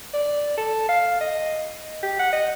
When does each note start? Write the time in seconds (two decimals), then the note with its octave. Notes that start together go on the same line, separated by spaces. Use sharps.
0.13 D5
0.58 A4
0.89 F5
1.21 D#5
2.03 G4
2.19 F#5
2.33 D#5